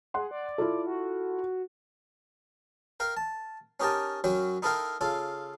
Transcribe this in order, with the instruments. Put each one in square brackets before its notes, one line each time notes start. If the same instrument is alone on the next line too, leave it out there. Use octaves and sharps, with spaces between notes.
[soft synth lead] G#4 [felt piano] F#5 C6
[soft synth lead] D5
[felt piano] E4 F4 A4
[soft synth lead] F#4
[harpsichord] A#4 F5 G5
A5
C#4 D#4 G4 A#4 G5 A5
F#2 F#3 C#4 F#4 G5
D#4 E4 A4 A#4 F5 G5
C#3 F4 A4